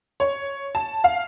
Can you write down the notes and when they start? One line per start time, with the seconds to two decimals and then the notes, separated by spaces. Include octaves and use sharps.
0.20 C#5
0.75 A5
1.04 F5